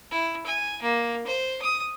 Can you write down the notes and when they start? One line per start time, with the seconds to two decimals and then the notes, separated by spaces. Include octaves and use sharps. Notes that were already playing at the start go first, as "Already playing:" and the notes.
0.11 E4
0.46 G#5
0.82 A#3
1.26 C5
1.62 D#6